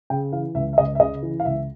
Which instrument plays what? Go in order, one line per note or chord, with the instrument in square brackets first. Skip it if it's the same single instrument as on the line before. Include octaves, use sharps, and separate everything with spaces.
[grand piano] C#3 G5
E3 F5
C#2 E5
E5
C#2 D#5
E5
C#3 D#5
E3
F5
C#2 E5